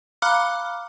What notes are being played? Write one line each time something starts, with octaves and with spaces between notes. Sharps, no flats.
F5 A#5 B5 D6 F6 F#6